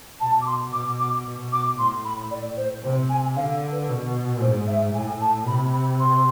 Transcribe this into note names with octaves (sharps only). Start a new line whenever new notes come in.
B2 A5
D6
C6
B2 D6
D6
B2
D6
A2 C6
B5
D5
C5
C3 C5
G#5
D3 F5
B4
B2
G#2 C5
E5
A2 G#5
A5
C3 B5
B5
C6